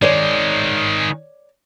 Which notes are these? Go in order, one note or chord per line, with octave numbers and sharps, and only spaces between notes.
D#3 G#3 C#5 D5